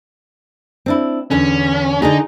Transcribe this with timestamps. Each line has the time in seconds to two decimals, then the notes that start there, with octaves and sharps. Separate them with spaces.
0.86 C4 D4 E4
1.31 E2 D3 C#4 D4
2.02 D3 D4 D#4 G#4